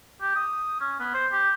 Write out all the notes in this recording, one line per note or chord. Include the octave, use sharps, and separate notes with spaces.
G4
D#6
C#4
B3
C5
G4